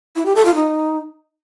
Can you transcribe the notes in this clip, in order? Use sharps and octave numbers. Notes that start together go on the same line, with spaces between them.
E4
G4
A4
F4
D#4